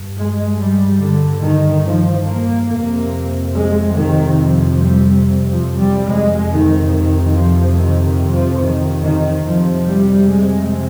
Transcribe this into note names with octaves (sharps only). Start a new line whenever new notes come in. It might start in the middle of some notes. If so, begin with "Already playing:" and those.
Already playing: G2
G#3
G3
D3
D#3
F3
A#3
F2 C3 A#3
G#3
D#3
F3
G3
F3
G3
F2 C3 G#3
D#3
D#3
F3
D#3
D#3
F3
D#3
D#3
F2 C3 F3
G3
G#3